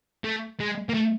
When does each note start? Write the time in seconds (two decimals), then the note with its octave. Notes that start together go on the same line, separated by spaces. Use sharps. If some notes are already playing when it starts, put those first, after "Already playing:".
0.24 A3
0.60 G#3
0.89 A#3
0.94 A3